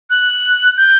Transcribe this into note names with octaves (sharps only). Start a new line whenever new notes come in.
F#6
G6